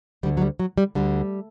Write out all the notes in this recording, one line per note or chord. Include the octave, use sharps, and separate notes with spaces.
D2 D3 G3
F#3
G3
F#3
G3
D2 D3 G3